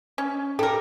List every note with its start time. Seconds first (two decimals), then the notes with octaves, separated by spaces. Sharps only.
0.18 C#4
0.59 G4 A4 A#4